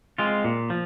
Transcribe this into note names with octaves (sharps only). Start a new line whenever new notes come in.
G#3 C4 F4
A#2
F3